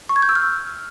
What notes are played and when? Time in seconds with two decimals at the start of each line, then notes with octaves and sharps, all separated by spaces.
0.09 C#6
0.16 G#6
0.22 G6
0.29 E6
0.35 F6